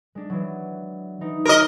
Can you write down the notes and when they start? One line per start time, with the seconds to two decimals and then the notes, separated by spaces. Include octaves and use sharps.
0.15 G#3 D4
0.30 E3 F#3
1.21 E3 D#4
1.46 A#4 D#5